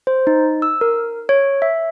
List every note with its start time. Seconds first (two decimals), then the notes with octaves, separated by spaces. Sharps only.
0.07 C5
0.27 D#4
0.62 E6
0.81 A#4
1.29 C#5
1.62 E5